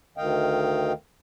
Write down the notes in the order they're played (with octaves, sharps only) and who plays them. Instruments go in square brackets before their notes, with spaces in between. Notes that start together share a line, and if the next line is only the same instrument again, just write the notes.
[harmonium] D2 D#3 D#5 F5 G5